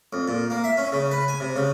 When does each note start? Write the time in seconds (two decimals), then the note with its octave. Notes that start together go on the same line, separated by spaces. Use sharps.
0.13 F2
0.28 A#2
0.50 A#3
0.64 E5
0.78 C#4
0.92 C#3
1.11 B4
1.28 G#5
1.40 C3
1.56 C#3